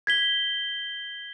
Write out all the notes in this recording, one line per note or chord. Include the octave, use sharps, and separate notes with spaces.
G#6 B6 G7